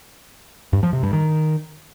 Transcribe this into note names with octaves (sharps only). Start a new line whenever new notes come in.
G2
F3
C3
G2
D#3